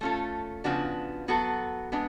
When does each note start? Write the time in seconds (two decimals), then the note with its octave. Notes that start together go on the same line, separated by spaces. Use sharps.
0.01 A3 C#4 F4 A4
0.64 C#3 F3 B3 D4 F#4
1.28 F#3 B3 F#4 A4
1.92 G#3 B3 D4